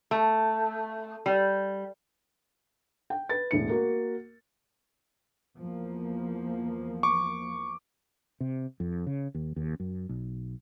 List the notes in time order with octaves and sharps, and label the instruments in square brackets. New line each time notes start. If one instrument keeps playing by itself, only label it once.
[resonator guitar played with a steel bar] A3
G3
[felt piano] G5
B4 A6
E1 A2 C#7
A#3 F#4 A#4
[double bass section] E2 F3 A#3
[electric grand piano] C#6 D6
[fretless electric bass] C3
F2
C#3
D#2
D#2
F#2
B1